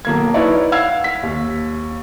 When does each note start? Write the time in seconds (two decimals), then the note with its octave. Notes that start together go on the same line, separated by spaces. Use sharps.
0.05 B1 A#3 G#6
0.34 D#4 E4 B4 C#5 D5
0.72 F5 F#5 E6 G#6
1.04 B6
1.23 D#2